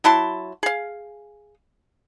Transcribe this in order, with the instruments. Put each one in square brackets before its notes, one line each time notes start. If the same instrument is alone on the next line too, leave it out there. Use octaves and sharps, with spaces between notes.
[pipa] F#3 E4 A5 C6
G#4 F5